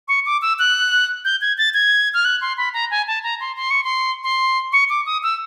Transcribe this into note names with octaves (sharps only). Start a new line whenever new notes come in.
C#6
D6
E6
F#6
G6
G#6
A6
G#6
F6
F#6
C6
B5
A#5
G#5
A5
A#5
C6
C6
C#6
C6
C6
C#6
D6
D#6
E6